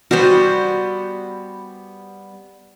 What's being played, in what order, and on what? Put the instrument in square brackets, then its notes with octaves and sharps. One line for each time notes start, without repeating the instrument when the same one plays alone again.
[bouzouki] G3 B3 [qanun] F#4 C5